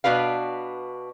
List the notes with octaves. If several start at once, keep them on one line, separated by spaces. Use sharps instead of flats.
B2 D4 F#4 B4 F5